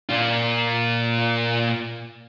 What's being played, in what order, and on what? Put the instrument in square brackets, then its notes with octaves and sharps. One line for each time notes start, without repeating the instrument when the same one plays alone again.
[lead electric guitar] A#2 F4